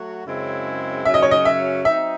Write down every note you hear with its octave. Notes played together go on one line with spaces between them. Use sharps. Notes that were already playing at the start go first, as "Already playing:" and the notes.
Already playing: F#3 A3 F#4
F#2 C#3 G#3 C4 E4
F#2 C#3 F#3 C#4 E5
D#5
C#5
D#5
E5
F#3 C4 D#4 E5